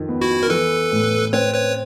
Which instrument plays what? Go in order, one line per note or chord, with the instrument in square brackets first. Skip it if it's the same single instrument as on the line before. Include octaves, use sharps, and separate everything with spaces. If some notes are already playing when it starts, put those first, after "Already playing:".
Already playing: [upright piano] F2 D#3
B3
[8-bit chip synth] E4 F#4
A#4
[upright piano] E3 [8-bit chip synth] A4 B4
[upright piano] A2
[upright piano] C4 [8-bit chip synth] B4 C#5
[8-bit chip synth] B4 C#5